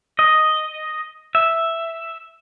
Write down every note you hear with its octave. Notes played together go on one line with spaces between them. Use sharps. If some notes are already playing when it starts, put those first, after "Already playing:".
D#5
E5